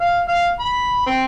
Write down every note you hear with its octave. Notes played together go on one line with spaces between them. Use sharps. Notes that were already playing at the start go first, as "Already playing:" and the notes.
F5
F5
B5
C4